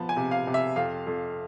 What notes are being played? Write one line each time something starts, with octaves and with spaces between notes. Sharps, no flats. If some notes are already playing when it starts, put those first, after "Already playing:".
Already playing: F3 B3 A5
G#5
C3
F5
C3
E5
F2 F5
F2